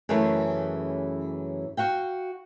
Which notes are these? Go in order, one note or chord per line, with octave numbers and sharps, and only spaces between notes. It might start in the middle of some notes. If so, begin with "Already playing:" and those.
F#2 C#3 E3 A3
F#4 F5 G5